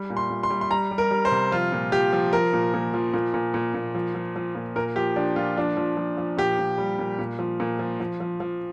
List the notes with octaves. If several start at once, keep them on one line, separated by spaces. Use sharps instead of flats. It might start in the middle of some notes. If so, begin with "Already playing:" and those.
Already playing: G3
A#2
C6
A#2
C6
G3
C6
G3 A#5
G3
A#4
G3
C5
C3
F3 F4
A#2
F3 G4
F3
F3 A#4
A#2
A#2
F3
A#2
A#2
A#2
A#2
F3
F3
F3
A#2
A#2 A#4
F3 G4
F3 D4
A#2 F4
F3 D4
F3
F3
F3
A#2 G4
A#2
G3
A#2
A#2
F3
A#2
F3
F3
F3
F3